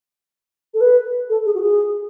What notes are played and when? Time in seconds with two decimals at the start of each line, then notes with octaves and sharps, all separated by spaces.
0.74 A4
0.81 B4
1.29 A4
1.46 G#4
1.55 F#4
1.61 G#4